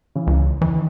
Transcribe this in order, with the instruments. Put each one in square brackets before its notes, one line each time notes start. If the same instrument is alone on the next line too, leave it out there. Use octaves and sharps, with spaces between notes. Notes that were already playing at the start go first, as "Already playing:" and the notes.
[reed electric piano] C#3 E3
[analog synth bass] C#2
[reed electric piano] E2 [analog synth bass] E3
[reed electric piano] D#3